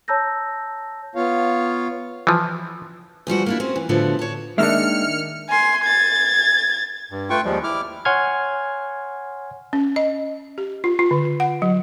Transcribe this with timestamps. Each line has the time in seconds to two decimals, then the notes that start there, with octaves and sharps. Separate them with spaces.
0.08 C#5 A5 A#5 E6 G6 A#6
1.15 B3 F4 C#5 F5
2.27 E3 F3
3.27 E2 F3 G3 F#4
3.46 A#3 D4 E4
3.60 C4 C#4 F#4
3.76 E3
3.89 A2 D3 F3 B3 E4 F#4
4.19 C#5 A5
4.58 D#3 G#3 A#3 D4 D#4 E5 F6 C#7
5.49 G#5 C6
5.84 G#6 A6
7.11 G2
7.30 A3 F4 B4 G5 C#6
7.45 D#2 F3 G3 G#3
7.63 E4 D6 F6
8.05 C#5 F#5 G#5 C6 F6 G#6
9.73 C#4
9.96 D#5
10.58 G4
10.84 F4
10.99 F4
11.11 D3
11.40 F#5
11.62 F#3